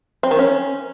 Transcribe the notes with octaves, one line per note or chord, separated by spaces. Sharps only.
C4
D#3
C#4